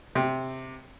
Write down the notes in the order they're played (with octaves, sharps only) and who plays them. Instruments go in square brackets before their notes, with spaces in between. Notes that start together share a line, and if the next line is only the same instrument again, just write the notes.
[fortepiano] C3